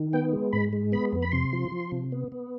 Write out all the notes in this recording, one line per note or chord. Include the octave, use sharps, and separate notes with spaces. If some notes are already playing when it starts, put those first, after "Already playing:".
Already playing: D#3
B3 G5
G#3
G#2 B5
G#3
B3 B5
F2
B5
C3 C6
F3
F3
C3
B3
B3